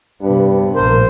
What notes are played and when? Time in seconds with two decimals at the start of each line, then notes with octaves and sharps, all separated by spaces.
0.21 G2 C3 B3
0.75 A#1 A2 A#4 C5